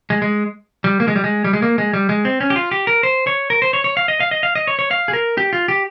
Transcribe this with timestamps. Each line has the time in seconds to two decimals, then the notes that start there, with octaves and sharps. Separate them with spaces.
0.10 G#3
0.22 G#3
0.84 G3
1.00 A#3
1.08 G#3
1.16 G3
1.24 G#3
1.45 G3
1.53 G#3
1.62 A#3
1.78 G#3
1.93 G3
2.09 G#3
2.25 C4
2.41 C#4
2.50 G4
2.56 F4
2.71 G4
2.87 A#4
3.03 C5
3.27 C#5
3.50 A#4
3.62 C5
3.73 C#5
3.84 C#5
3.97 F5
4.08 D#5
4.20 F5
4.31 D#5
4.43 F5
4.55 D#5
4.67 C#5
4.79 C#5
4.91 F5
5.08 G#4
5.13 A#4
5.38 G4
5.53 F4
5.68 G4